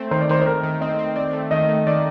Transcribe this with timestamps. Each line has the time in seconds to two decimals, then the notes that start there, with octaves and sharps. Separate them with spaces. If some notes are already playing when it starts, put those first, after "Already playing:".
Already playing: A3 C4
0.11 D#3 C5
0.21 D5
0.29 D#3 C5
0.41 C5
0.46 D#3 A#4
0.63 D#3
0.81 C4 D#5
0.99 C4
1.16 C4 D5
1.33 A3
1.51 D#3 D#5
1.69 A3
1.86 D#3 D5